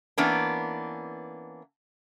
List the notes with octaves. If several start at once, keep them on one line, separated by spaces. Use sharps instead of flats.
E3 A#3 B3 C#4 D4